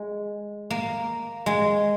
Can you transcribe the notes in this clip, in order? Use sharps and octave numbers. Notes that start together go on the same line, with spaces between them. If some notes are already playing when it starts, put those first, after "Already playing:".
Already playing: G#3
A#3
G#3